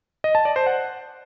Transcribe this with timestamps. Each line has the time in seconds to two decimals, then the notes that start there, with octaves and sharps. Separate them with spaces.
0.24 D#5
0.35 A5
0.45 D5
0.56 C5
0.66 F#5